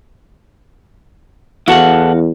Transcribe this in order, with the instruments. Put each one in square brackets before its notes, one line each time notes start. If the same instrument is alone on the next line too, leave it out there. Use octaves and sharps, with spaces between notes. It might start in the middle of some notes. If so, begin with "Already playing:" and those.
[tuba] E2 [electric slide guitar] E4 A4 F#5 [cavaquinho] F#4 F5